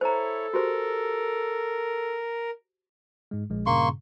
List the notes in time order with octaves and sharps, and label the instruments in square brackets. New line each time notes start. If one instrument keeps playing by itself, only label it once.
[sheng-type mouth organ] E4 C#5 [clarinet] A4 [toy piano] C5 A#5
[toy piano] F#4 G4 C5 [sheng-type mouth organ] A#4
[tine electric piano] G#2 G#3
A#1 G#3
[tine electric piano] G2 A#2 C#3 [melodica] A#3 C6 C#6